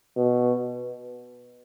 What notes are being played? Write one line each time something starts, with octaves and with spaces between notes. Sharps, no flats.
B2